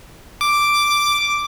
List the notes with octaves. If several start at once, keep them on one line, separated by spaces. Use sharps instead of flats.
D6